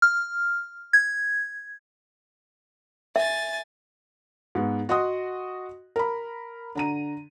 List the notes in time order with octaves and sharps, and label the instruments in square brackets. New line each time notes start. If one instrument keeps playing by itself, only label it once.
[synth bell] F6
G#6
[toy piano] E5 [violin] G#5 A6
[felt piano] G#2 B3
F#4 D#5 F#5 C6 D#6
A#4 B5
D3 A#5 D#7